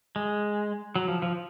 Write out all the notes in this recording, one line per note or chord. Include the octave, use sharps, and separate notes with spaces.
G#3
F#3
F3
F3